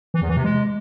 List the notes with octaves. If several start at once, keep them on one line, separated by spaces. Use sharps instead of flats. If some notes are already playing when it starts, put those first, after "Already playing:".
E3
E2
E3
C3
G#3